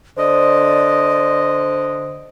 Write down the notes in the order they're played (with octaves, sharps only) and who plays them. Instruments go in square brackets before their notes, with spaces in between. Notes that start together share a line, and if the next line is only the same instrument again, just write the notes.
[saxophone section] D3 D#5 [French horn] C5 [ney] D5